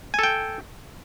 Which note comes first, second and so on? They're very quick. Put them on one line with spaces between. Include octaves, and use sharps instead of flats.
G#5 A4 G5